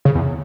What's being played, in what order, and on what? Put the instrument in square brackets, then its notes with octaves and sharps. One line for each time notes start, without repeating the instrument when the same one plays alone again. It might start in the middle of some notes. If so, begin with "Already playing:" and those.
[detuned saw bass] C#3
E2